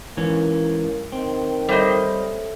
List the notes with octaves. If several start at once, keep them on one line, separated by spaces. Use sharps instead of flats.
G#2 E3 A#3 C#4
D#3 C4
G3 A4 C5 C#5 D#5 E5